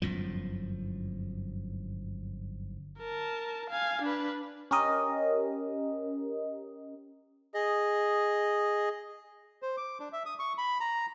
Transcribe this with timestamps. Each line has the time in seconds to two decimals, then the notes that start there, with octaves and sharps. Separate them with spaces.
0.02 G1 F#2 A2 F3
3.00 A#4 A5
3.70 F5 G#5
4.02 D4 B4
4.71 C#4 G4 A#4 D#5
7.54 G#4 D#5
9.62 C5
9.77 D6
10.00 D4
10.13 E5
10.26 D#6
10.39 C#6
10.58 B5
10.80 A#5